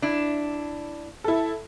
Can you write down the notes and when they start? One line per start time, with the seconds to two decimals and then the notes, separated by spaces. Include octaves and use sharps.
0.02 D4 E4
1.24 E4 A4